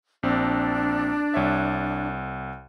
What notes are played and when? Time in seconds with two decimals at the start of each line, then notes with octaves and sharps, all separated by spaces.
0.23 A#1 C4 D4
1.34 C2 C#5 E5